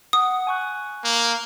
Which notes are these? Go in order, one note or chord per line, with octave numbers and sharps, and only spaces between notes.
F#5 D#6
G#5 C#6 F#6
A#3